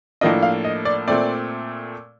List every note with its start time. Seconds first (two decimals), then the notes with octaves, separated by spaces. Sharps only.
0.21 A2 F3 A#3 D4 D#5
0.43 F5
0.65 D#5
0.85 D5
1.08 A#2 A3 C4 D5